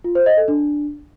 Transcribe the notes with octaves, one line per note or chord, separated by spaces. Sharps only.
F4
C5
D#5
A4
D4